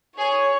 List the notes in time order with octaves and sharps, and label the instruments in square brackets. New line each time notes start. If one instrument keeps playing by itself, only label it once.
[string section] G#4 [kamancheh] C#5